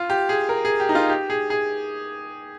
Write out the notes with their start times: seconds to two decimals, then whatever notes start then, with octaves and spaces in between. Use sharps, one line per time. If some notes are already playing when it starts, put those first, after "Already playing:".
Already playing: F4
0.10 G4
0.29 G#4
0.49 A#4
0.65 G#4
0.80 G4
0.89 D#4
0.95 F4
1.10 G4
1.30 G#4
1.50 G#4